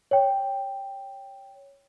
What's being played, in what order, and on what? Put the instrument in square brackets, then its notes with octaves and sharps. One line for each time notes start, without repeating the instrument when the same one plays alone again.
[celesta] C#5 G5